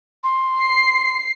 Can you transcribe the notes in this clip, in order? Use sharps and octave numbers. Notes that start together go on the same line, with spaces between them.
C6
C7